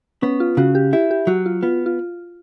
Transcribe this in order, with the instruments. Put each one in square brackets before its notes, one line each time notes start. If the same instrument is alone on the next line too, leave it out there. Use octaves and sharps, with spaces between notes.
[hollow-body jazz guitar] B3 [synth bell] C#4
[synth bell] F4
[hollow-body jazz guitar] C#3 [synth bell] F#4
[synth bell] G4
[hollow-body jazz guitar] E4 [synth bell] G4
[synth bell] G4
[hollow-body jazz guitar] F#3 [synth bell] F#4
[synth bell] F4
[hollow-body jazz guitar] B3 [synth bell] F4
[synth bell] F4